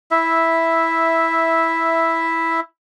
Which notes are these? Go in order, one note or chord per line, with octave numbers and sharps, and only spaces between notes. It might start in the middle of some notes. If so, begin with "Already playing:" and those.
E4 E5